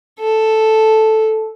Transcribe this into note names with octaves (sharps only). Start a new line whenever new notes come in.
A4